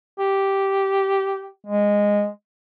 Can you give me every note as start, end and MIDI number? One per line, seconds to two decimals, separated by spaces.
0.19 1.48 67
1.67 2.28 56